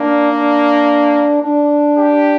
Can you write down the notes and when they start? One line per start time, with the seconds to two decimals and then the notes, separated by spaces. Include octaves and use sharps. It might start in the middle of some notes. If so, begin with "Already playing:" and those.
Already playing: A#3 D4
0.33 D4
1.42 D4
1.97 G4